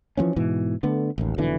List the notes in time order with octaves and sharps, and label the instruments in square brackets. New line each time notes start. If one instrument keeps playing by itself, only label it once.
[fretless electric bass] E3 F3 B3 C#4
G#2 B2 E3
D3 A3 B3
A1 D#2
F1 B2 D3 E3